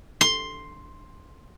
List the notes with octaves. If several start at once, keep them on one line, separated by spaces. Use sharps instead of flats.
C6